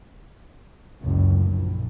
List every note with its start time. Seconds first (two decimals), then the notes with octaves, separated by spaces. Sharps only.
1.01 F#1 C#2 F#2
1.39 A#1 A#2